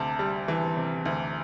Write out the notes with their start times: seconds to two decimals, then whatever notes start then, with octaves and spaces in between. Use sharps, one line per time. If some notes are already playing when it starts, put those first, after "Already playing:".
Already playing: D2 C3 A5
0.19 G3
0.48 E3
0.77 C3
1.06 D2